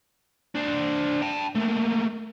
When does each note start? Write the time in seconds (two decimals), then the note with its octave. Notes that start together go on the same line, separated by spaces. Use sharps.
0.55 D4 C5
1.22 G5 A5
1.55 A3 A#3